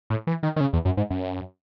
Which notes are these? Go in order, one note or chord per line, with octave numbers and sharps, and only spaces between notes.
A2
E3
D#3
D#3
C#3
E2
F#2
G#2
F#2